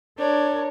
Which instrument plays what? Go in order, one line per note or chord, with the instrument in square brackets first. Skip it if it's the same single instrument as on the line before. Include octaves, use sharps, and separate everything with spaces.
[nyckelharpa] D4 [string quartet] A#4 C#5